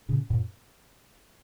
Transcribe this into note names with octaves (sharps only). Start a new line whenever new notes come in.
A#2 C#3
F#2 A#2